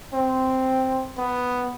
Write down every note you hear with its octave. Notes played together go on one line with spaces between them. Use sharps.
C4
B3